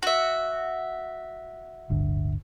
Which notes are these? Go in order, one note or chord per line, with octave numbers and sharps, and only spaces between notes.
F#4 E5
D1 G1 D3